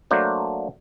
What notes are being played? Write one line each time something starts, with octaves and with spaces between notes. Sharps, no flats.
F#3 A3 A#3 D4 C5